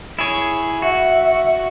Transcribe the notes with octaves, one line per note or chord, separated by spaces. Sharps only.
E4 G#4 C#5
F#4 E5